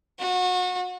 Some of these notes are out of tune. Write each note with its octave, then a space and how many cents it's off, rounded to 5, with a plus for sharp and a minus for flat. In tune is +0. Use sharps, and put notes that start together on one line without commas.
F#4 -30